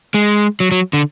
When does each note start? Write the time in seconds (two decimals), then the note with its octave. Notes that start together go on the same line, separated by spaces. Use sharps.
0.14 G#3
0.60 F#3
0.71 F#3
0.93 D3